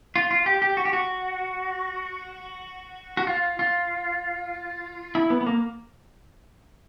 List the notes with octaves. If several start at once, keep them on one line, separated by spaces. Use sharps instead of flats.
F4
F4
G4
G4
F#4
G4
F#4
F#4
F4
F4
E4
B3
B3
A#3